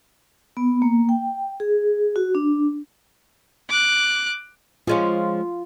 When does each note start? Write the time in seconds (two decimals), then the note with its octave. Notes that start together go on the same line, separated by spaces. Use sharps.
0.57 B3
0.82 A#3
1.09 G5
1.60 G#4
2.16 F#4
2.35 D4
3.69 D6 F#6
4.87 F3 G#3 C#4 F4